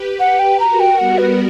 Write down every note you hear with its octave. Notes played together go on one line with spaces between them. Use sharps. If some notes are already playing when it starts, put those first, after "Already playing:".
Already playing: G4 B4
F#5
G5
F#4 A#4 A#5
G5
G3 B3 F#5
B4